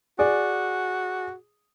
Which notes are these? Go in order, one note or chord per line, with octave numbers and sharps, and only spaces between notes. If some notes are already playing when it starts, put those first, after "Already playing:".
F#4 G#4 D5